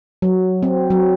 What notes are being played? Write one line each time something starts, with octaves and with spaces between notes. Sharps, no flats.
F#3
C4
F#3